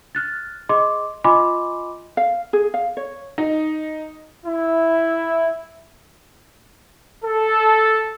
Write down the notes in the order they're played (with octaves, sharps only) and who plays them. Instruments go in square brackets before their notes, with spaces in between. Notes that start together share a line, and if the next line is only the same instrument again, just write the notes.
[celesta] F6 F#6 A6
G#4 D#5 C6 D6
F4 D#5 G#5 B5 C6 D6
[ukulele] F5
G#4
F5
C#5
[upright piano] D#4
[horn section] E4
[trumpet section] A4